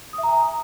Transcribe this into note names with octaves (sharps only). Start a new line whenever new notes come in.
D#6
E5
A#5
G#5